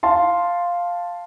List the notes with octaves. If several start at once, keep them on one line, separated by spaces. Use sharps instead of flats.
F5 A5 C6